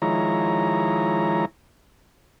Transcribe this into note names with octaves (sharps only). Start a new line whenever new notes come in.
D#3 F3 G#3 E4 C#5 A#5